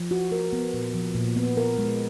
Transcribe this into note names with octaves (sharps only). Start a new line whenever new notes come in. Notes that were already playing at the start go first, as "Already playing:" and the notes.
Already playing: F3
F#4
A#4
B3
A#2
F3
A#2
B3
A#4
G#3